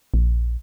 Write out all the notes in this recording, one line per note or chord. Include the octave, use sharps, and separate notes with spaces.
A#1